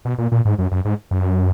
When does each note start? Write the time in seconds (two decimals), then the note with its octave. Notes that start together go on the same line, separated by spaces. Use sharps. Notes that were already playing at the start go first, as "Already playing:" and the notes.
0.05 B2
0.18 A#2
0.32 A#2
0.45 G#2
0.58 F#2
0.71 F#2
0.85 G#2
1.11 F#2